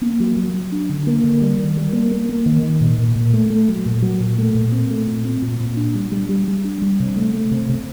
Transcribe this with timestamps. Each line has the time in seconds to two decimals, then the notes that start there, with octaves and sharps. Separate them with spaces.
0.01 A#3
0.20 F#3
0.37 F#3
0.54 F#3
0.72 D4
0.89 D3
1.07 A#3
1.24 D3
1.42 G3
1.58 D#3
1.77 G3
1.93 A#3
2.11 A#3
2.29 A#3
2.46 D#3
2.63 D#3
2.81 A#2
2.98 A#2
3.16 A#2
3.33 A3
3.50 A3
3.69 F#3
3.86 A#2
4.02 F#3
4.20 A#2
4.38 A3
4.55 A#2
4.72 C4
4.91 A3
5.07 A#2
5.25 C4
5.42 A#2
5.60 A#2
5.77 D4
5.95 G3
6.11 G3
6.29 G3
6.47 G3
6.65 D4
6.82 G3
7.00 C3
7.16 A3
7.33 A3
7.51 C3
7.69 C3